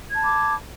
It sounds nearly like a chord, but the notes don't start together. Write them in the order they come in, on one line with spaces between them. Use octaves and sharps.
G#6 A5 B5 D6